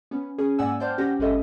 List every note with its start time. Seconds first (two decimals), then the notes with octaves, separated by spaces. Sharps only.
0.11 B3 C#4
0.38 C#4 G#4
0.59 G#2 A#3 D5 F#5 G#5 E6
0.80 C5 D5 G5 A5 F6 G6
0.98 C#4 G4 F#5 A#6
1.19 G1 G#3 C#4 A4 D#5 E5